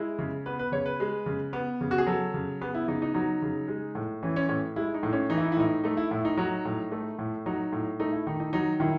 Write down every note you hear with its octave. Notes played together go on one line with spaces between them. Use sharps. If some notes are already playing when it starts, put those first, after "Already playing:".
Already playing: G#3 E4
C#3
B3 B4
B4
C#3 C#5
B4
G#3
C#3
B3
C#3
F#4
G#4
F#3 A4
C#3
B3 G#4
E4
C#3 D#4
D#4
F#3 D#4
C#3
G#3
A2
E3 C#4
C#4
A2 C#4
G#3 E4
D#4
A2
C#4
E3 D#4
E4
D#4
E4
A2 D#4
A3 D#4
E4
A2 E4
D#4
F#3 D#4
A2
A3
A2
F#3 D#4
A2
A3 D#4
E4
D#3 D#4
D#4
F#3 D#4
D#3 E4